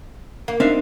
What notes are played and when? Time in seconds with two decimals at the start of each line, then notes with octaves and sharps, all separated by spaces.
0.48 A#3
0.60 C4 D4 D#4 E5 F5